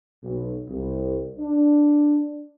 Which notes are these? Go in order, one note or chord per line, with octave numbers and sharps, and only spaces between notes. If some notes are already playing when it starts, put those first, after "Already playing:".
B1
C2
D4